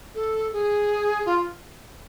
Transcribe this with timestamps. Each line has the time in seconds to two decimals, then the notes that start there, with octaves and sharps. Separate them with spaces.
0.15 A4
0.53 G#4
1.26 F4